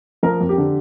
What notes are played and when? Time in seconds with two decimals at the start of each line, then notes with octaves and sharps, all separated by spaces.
0.23 F3 A#4
0.41 F2
0.49 G4
0.58 D3